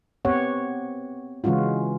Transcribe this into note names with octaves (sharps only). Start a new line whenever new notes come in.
B3 C4 G4 C#5 F#5
C#3 E3 G#3 C#4 F4 F#4